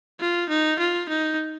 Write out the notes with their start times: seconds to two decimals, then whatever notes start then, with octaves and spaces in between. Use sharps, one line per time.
0.20 F4
0.49 D#4
0.79 F4
1.09 D#4